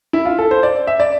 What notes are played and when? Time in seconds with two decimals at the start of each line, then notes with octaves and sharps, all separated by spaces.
0.13 E4
0.25 F4
0.39 A4
0.51 C5
0.63 D5
0.87 E5
1.00 D5